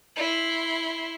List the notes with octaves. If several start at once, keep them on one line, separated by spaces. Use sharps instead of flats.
E4 C6